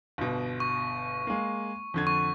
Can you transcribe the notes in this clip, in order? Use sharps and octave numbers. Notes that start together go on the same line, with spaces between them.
G1 B2
C#6
G#3 A#3
F2 D3 G#6
C#6